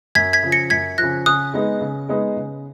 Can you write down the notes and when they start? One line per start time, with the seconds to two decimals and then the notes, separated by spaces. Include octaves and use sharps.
0.15 F#2 G#6 B6
0.33 G#6 B6
0.43 C#3 F3
0.52 A#6 C#7
0.70 F#2 G#6 B6
0.98 C#3 F3 F#6 A#6
1.26 C#3 D#6 F#6
1.53 G#3 B3 D#4 G#4
1.81 C#3
2.09 G#3 B3 D#4 G#4
2.36 C#3